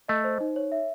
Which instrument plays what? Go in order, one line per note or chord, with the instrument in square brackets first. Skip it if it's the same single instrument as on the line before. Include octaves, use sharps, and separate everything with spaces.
[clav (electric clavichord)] A3 [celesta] D#5
[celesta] C5
D#4
C#5
E5